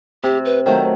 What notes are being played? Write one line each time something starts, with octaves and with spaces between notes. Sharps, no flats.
C3 G4
B4
D#3 F#3 A3 C5